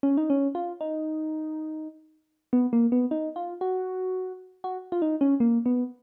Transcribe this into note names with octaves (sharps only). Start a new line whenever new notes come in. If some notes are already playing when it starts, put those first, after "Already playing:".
C#4
D#4
C#4
F4
D#4
B3
A#3
B3
D#4
F4
F#4
F#4
F4
D#4
C#4
A#3
B3